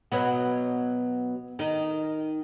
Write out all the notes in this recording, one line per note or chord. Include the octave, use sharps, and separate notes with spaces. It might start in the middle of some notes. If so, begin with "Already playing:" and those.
B2 F#3 B3
D#3 D#4